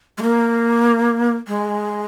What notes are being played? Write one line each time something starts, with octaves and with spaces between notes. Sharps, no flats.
G#3
A#3
G#3